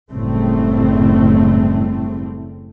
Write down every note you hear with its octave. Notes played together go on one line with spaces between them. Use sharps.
F#1 A2 G3 A3 C4